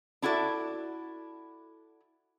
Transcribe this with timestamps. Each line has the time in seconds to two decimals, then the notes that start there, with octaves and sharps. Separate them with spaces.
0.22 D4 E4 F#4 A4 D5